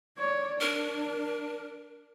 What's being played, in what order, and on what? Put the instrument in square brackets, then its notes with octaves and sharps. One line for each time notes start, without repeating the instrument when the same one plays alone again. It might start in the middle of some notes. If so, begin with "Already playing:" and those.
[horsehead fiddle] C#5 D5
[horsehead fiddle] D4 [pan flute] A#4